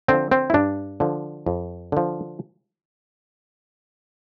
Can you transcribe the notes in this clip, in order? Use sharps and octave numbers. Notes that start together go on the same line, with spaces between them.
D3 F3 C4
C4
E4
G2 D4
D3 F3
F2
D3 F3